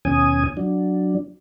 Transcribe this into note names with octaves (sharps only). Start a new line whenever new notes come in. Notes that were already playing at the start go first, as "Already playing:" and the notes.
D#2 B2 C#4 G#5 D#6
F#3 D4